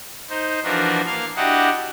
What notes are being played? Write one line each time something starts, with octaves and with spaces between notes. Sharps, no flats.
D#4 C5
E3 F3 D4 F#4 A#4 B4
A#3 F5 F6
D4 E4 F#4 G4 D#5 F#5